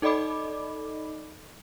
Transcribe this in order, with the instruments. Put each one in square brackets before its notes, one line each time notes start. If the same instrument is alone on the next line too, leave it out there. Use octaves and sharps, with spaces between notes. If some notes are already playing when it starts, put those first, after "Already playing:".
[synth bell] D#4 A4 D5 D#5 B5 D6